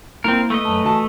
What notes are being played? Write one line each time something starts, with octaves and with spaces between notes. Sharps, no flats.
A#3 C4 E4 A#4
A3 B4 D#5
F#2 A5
E3 F#4 A5